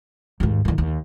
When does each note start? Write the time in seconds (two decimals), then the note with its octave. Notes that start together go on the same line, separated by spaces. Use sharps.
0.40 D#2 G#2
0.65 E2 D#3
0.78 D#2